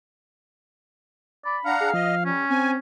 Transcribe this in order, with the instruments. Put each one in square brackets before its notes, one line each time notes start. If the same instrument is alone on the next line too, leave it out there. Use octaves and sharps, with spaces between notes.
[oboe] D5 [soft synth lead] B5
[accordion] D4 F#5 A#5 [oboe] F5
[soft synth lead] G#4
[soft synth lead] F3 [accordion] D#5
[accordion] G3 [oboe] C#4
[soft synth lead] C4 [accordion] G#5